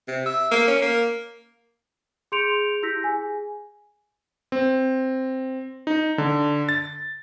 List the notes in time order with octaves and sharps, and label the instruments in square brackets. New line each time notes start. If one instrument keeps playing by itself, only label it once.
[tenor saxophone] C3
E5
A#3
C#4
A#3
[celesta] G#4 C6 G6 C#7 D7 F7
E4 G4 E6 G6 A#6 B6
G#4 G#5
[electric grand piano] C4
D#4
D3
A6